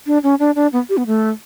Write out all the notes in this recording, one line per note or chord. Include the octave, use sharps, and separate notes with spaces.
D4
C#4
D4
D4
B3
G4
B3
A3